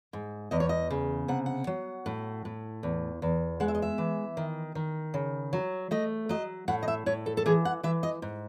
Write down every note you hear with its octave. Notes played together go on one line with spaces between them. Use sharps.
G#2
E2 D#5
C#5
D#5
C#3
C3 F#5
F#5
F#3
A2
A2
E2
E2
G#3 F#5
E5
D#5
E5
E3
D#3
D#3
C#3
F#3
A3 D#5
F#3 D#5
A2 F#5
D#5
E5
A2 C#5
A4
A4
E3 G#4
F#5
E3 E5
D#5
G#2